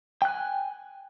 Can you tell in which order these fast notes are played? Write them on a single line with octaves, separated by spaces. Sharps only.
G5 F#6 G#5